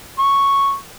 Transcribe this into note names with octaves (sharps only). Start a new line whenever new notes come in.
C#6